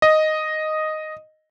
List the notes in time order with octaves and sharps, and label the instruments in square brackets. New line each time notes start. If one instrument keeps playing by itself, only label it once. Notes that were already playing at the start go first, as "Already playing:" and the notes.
[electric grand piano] D#5